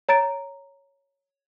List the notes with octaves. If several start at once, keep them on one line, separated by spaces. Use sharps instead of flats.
C#5 A#5 A6 D7